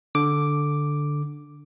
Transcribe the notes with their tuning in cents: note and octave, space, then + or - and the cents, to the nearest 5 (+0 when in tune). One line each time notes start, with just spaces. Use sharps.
D3 +0 D6 +0